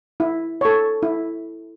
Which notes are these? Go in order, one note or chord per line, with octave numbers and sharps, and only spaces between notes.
E4
A4 C#5
E4